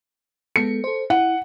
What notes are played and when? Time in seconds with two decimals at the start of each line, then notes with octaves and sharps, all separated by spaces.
0.56 G#3 B3 A4 C#7
0.84 A4 C5
1.10 E4 F#5